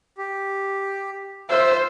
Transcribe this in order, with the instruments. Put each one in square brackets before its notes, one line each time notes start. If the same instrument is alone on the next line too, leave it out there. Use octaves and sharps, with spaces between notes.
[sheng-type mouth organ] G4
[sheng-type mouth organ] F4 E6 [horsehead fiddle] C5 [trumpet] E5